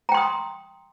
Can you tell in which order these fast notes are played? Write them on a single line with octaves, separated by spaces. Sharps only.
A#5 G5 C6 D#6